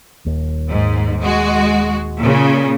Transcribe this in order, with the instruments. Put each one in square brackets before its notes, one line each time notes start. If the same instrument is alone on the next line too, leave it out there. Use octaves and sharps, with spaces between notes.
[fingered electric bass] D#1 D#2
[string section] G#2
G#3 F#4
A#2 C#3